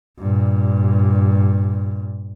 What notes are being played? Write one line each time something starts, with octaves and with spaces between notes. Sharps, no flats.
G2 A#2